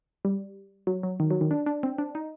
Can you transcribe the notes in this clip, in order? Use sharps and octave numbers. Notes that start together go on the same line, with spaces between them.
G3
F#3
F#3
D#3
F#3
D#3
D4
D4
C4
D4
D#4